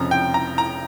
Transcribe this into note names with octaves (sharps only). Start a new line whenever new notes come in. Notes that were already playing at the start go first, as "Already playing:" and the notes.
Already playing: F1 F2 C#3 F3 A#5
G5
A#5
A#5